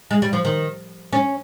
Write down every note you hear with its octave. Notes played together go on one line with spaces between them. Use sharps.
G#3
G3
F3
D#3
C#4